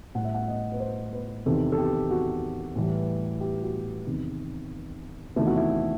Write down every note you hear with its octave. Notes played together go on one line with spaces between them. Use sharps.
A2 G3 F#5
E5
F#5
D#5
B4
C5
B4
E2 C3 D#3 A4
A4
G4
F#4
A2 E3 G3
G4
F#4
E2 C3 D#3
E2 C3 D#3 A3 E4
F#4
E4